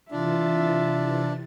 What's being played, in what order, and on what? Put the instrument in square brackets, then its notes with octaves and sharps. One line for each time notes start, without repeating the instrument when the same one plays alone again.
[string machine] C3 E3 A6 [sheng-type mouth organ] D4 [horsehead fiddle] F4 E5